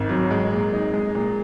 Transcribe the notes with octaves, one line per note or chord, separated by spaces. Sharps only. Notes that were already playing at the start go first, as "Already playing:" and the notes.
Already playing: G#1 G#2
F#3
G#3
A#2
D#4
G#3
A#2